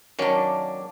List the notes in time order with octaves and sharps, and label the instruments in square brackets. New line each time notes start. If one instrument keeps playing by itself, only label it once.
[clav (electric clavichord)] D#3 F#3 C#4 [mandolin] A#3 D4